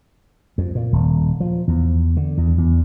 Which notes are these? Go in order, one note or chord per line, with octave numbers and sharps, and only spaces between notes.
F2
A#2
D#1
F3
E2
D3
E2
E2